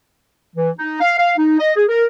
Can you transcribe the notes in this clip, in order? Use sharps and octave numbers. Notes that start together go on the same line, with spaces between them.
E3
D#4
F5
F5
D#4
D#5
G#4
A#4